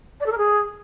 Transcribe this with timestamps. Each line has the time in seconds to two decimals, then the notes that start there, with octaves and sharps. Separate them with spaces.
0.20 D5
0.26 A4
0.32 A#4
0.38 G#4